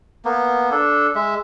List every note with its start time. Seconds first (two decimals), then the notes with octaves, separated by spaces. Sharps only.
0.25 A#3 B3
0.72 D4 A4
1.15 G#3 E5